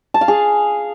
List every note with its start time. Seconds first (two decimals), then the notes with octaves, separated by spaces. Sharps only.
0.14 A5
0.21 F5
0.28 G#4